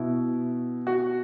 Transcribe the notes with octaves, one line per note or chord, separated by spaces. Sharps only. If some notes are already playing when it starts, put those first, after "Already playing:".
Already playing: B2 E4
F#4